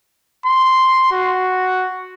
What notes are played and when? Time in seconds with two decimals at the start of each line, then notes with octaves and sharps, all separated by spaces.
0.46 C6
1.12 F#4